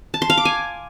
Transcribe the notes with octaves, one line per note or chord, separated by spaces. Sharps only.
A5
C6
F5
D6
G#5